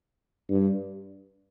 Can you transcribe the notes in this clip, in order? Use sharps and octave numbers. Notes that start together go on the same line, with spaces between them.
G2